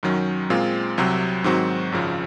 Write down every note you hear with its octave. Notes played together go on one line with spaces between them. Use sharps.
F#2 D#3 F#3 C#4
A#2 G#3 C4 F4
C2 C3 F#3 C4
G#2 D#3 F#3 C4 F#4
G#1 F#2 C#3 F3